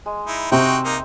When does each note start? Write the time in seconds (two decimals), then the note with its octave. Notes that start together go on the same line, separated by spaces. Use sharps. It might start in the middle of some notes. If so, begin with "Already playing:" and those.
0.06 G#3
0.27 D#4 E4
0.52 C3 C4 D#4 F#4 C5 G5
0.85 A#3 D#4